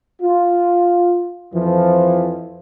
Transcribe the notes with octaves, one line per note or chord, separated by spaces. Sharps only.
F4
F2 E3 F3